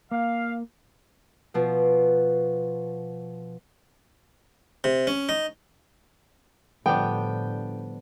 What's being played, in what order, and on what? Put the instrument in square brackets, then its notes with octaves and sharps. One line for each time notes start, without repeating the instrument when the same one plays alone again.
[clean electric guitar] A#3 [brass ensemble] F5
[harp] B2 F3
[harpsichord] C3
C#4
D#4
[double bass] A2 [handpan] D3 F3 G3 [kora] B3 D4 [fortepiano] G5